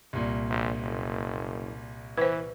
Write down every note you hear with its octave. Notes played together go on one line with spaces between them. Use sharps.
C2 A#2
A#1
F#1
E3 B4 C5